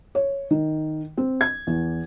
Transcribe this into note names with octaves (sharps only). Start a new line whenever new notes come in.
C#5
D#3
C4
G#6
E2